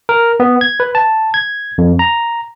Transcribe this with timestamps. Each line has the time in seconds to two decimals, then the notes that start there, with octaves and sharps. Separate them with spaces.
0.09 A#4
0.40 B3
0.61 G#6
0.80 B4
0.95 A5
1.34 G#6
1.78 F2
1.99 A#5